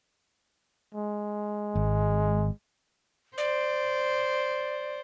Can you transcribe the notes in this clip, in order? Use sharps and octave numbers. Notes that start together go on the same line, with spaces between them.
G#3
G#1
C5 D5